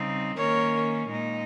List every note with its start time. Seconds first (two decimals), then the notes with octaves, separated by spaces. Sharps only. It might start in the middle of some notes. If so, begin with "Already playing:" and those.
Already playing: C#3 G3 C4 D#4
0.36 D#3 A#3 C#4 A#4 C#5
1.08 A#2 G#3 D#4